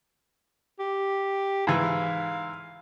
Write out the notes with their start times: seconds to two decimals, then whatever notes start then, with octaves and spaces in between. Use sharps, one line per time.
0.80 G4
1.67 G#2 E3 F5